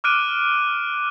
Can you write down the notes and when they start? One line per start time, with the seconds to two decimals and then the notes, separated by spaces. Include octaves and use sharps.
0.04 D6 F6 F#6 D7 D#7